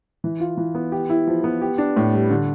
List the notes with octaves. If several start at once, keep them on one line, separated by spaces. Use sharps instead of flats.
E3
F4
E3
B3
G4
E4
F3
B3
G4
D4
A2
G3
D3